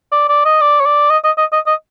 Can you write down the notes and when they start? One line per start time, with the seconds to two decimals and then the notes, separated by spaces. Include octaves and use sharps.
0.12 D5
0.29 D5
0.45 D#5
0.61 D5
0.80 C#5
0.86 D5
1.10 D#5
1.24 D#5
1.38 D#5
1.53 D#5
1.67 D#5